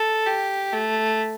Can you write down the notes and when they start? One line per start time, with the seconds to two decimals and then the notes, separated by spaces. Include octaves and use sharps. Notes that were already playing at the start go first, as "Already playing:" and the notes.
Already playing: A4
0.26 G4
0.72 A3